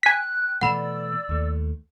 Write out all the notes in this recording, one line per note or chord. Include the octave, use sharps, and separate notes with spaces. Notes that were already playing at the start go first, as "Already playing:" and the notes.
G5 G#5 F#6 B6
B2 E3 A3 D5 F#5 B5 E6 E7
D#2 A3